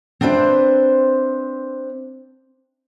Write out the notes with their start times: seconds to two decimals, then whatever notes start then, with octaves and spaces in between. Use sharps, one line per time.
0.21 C4 D4 B4 C5 E5